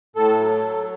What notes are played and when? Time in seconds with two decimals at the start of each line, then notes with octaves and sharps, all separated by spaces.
0.16 A2 A4
0.39 F#3